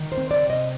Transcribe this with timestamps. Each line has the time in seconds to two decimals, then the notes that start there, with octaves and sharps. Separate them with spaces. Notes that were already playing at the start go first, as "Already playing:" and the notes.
Already playing: D#3
0.12 C5
0.17 C4
0.31 D5
0.43 C3
0.50 D#5